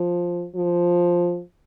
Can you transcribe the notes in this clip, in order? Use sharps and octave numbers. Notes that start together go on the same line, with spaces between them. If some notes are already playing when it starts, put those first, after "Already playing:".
Already playing: F3
F3